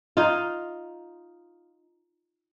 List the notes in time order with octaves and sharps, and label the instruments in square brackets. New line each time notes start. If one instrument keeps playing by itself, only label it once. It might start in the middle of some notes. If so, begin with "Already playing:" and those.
[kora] D#4 F4